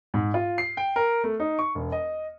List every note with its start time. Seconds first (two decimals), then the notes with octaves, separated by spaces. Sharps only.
0.14 G#2
0.34 F4
0.58 C7
0.77 G5
0.96 A#4
1.24 A3
1.40 D#4
1.59 C#6
1.75 E1
1.92 D#5